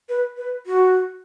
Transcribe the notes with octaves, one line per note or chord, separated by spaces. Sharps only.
B4
B4
F#4